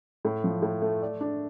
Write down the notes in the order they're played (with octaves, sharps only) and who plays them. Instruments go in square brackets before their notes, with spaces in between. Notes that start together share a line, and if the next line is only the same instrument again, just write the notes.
[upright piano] A2
F3
A2
A3
D5
D4